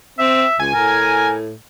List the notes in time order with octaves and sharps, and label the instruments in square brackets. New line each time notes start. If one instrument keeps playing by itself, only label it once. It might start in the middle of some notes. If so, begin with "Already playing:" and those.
[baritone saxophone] C4 [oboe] E5
[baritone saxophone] C#2 [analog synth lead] G#5
[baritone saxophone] A2 [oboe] A#4